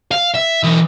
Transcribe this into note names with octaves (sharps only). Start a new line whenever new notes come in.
F5
E5
E3 D#4